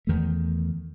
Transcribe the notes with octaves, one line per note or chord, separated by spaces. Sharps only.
E2 D#3 A3